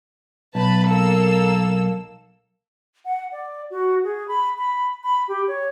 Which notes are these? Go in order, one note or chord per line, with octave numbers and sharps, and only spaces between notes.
B1 B4 A5 B5
A#3 A4 E6
F#5
D5
F#4
G#4
B5
B5
B5
G4
C#5